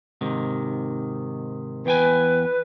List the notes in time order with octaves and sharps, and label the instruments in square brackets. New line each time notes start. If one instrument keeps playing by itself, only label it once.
[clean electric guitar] G#2 C3 D#3
[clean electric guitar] E2 G5 G#5 [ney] B4